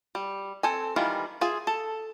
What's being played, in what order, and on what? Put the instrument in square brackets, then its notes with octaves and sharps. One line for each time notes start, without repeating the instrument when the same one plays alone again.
[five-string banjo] G3
C4 A4 G#5
D#3 E3 G3 F4
F4 G#4 E5 G#5
A4